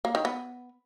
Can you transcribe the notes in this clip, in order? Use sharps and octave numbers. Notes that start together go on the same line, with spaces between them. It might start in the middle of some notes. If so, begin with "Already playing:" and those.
A#3
D#3
B3